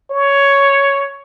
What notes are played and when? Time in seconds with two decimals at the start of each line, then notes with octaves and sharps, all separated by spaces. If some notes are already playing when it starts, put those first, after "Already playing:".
0.10 C#5